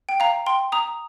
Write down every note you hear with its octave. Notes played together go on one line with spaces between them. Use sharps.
G5
F5 A#5
G5 C6
A#5 D#6